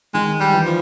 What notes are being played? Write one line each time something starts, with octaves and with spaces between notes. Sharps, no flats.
D#3 G#3
G3
E3
F3